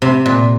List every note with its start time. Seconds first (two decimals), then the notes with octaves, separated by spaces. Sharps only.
0.02 C3
0.26 A#2